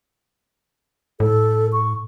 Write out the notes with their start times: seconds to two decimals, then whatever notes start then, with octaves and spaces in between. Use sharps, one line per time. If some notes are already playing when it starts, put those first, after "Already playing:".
1.20 A2 A4
1.73 C#6